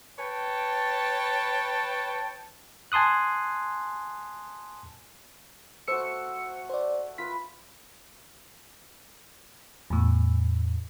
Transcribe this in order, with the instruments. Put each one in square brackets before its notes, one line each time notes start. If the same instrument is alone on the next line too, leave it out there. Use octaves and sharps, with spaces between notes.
[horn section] B4 C#5 G5 A5
[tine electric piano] G#5 A5 C6 D#6 F#6
[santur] A3 F#4 [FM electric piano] C5 E6 C#7
[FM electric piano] C5 D5
[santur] F4 B4 [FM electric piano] B6
[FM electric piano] E2 A2